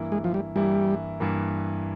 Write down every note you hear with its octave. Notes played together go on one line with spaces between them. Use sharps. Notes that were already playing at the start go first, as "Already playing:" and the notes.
Already playing: G2 E3 A#3 E4
G#3
F3
G3
G2 E3 G3 A#3 E4
G2 E3 A#3 E4